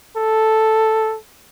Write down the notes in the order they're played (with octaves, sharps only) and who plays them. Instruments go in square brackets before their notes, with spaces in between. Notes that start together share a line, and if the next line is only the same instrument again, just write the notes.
[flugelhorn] A4